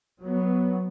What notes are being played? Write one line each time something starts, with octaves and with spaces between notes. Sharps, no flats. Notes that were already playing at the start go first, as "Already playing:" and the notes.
F#3 B3